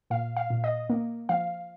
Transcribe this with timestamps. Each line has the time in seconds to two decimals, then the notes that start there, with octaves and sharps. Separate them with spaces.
0.10 A#2 F5
0.37 F5
0.50 A#2
0.64 D#5
0.90 A#3
1.29 F3 F5